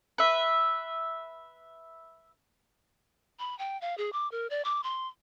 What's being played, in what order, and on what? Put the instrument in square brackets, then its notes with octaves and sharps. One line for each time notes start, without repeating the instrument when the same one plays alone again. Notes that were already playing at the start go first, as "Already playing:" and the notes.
[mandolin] B4 E5
[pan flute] B5
G5
F5
G#4
D6
A#4
D5
D6
C6